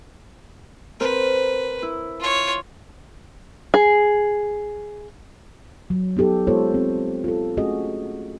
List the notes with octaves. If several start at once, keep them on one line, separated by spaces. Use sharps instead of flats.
C4 A#4 B4
E4
F4 C#5
G#4
F#3
B3 D#4 G4 A4
G#3 B3 F4 A4 C5 C#5
C4
F4 A4
A3 C#4 F#4 G#4 D#5